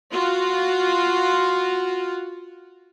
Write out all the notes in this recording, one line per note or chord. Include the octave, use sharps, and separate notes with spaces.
F4 F#4